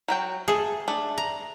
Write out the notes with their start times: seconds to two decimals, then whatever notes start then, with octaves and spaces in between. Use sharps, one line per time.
0.08 F#3 F#4 G5
0.48 A3 G#4 A4
0.88 A3 D4
1.18 A#5